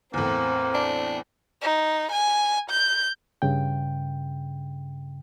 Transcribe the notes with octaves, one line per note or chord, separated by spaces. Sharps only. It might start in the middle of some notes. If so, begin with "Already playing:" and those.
E2 A2 A#3 C4
D4
D#4
G#5
G6
G2 C#3 G5